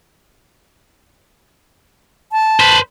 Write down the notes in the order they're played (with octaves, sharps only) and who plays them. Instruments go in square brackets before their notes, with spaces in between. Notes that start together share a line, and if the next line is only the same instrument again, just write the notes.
[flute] A5
[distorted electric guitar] B4 C5